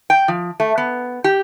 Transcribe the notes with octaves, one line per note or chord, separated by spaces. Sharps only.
G5
F3
A3
B3
G4